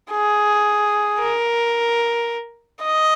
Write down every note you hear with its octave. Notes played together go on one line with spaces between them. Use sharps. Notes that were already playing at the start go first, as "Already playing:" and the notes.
G#4
A#4
D#5